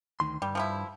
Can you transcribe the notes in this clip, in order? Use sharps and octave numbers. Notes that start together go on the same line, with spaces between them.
D2 D#3 C6
G2 G3
F3 G3 E4